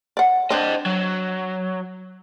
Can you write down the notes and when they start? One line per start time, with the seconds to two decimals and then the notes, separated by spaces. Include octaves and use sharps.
0.17 D5 F#5
0.50 C4 D4 C5 D#5
0.86 F#3